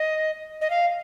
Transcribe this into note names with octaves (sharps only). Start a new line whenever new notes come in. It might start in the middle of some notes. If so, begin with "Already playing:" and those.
Already playing: D#5
D#5
F5